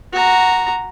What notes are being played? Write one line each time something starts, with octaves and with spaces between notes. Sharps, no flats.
F#4 A#5